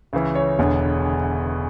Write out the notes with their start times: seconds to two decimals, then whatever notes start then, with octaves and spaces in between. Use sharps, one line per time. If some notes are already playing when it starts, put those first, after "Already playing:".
0.13 C#2 C#3 E3
0.35 C#5
0.59 E1 E2 D3